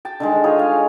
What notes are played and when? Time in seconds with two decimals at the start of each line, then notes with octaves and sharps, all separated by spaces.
0.05 G5 A5
0.20 D3 D#3 G#3
0.44 D#4 F4 G#4 C#5
0.59 F5